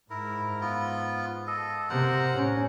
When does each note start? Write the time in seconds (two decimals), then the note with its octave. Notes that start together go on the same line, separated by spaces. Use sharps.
0.10 G#2 E4 A#4
0.61 B3 F4
1.47 A4 D#5
1.90 C3 A#4 C5 F#5
2.32 A2 C#4